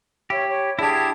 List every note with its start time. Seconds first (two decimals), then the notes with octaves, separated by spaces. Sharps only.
0.30 E4 G4 C#5
0.48 C#5
0.79 D3 D4 E4 G4 G#4 A5 A#5 G#6